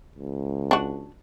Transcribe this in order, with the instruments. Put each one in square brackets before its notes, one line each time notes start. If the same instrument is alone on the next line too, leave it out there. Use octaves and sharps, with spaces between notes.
[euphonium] C#2
[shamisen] D4 F#4